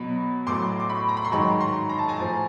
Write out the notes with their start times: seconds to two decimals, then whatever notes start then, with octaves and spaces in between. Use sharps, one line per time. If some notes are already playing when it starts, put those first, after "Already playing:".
Already playing: B2 F#3 B5
0.46 A2 F#3 C6 D6
0.80 D6
0.89 B5 C#6
1.09 A#5
1.17 B5
1.25 C6
1.32 G#2 D#3 F#3 B5 C#6
1.60 A#5 C6
1.89 A#5
1.99 A5
2.09 G#5 A#5
2.18 A2 F3